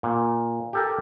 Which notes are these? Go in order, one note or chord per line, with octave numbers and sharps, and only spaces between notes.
A#2
G4 A4 A#4